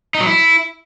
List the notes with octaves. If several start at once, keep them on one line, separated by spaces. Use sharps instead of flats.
D#4
F#3
E4